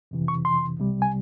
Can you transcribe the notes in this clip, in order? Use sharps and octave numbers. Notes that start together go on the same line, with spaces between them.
F2 C3 E3
C#6
C6
C2 C3 G3
G#5